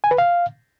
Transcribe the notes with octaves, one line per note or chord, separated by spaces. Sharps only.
G#5
B4
F5